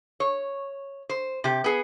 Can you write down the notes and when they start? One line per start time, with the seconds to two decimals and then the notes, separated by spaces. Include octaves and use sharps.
0.20 C#5
1.09 C5
1.44 C3 G4
1.64 B3 G#4